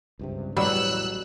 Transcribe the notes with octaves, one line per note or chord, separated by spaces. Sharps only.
C#2 G2 C3
A1 E2 B2 F#3 G3 E6 F#6